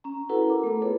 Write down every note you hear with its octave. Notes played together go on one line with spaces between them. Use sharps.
C#4 A#5
E4 F#4 A4 B4 F#5 A#5
A#4 D6
A3 B3 A4
B3 F4 G#4 A4 B4 C#5